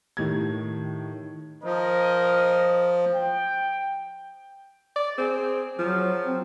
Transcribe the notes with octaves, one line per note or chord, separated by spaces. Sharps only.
A2 D#3 G4 G#6
F3 A#4 D#5
G5
D5
C4 G#4
F3 F#3
C4